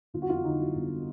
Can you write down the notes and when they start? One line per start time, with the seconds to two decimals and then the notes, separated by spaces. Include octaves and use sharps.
0.14 G1 F4
0.22 F#4
0.29 F2 F4
0.44 D3 D#4
0.60 F#3 E4
0.75 G1